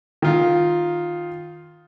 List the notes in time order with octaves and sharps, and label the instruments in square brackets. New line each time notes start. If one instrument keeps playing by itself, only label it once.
[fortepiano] D#3 F4